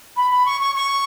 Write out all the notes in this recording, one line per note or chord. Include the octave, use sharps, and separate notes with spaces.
B5
B5
C#6
C#6
C#6